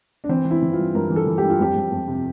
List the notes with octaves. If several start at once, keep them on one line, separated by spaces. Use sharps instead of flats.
D4
E3 C4
E3
E4
E3
G2 F4
G2 A#4
E3
A4
E3
G2 G4
F4
F2 G4
F2
F2
C3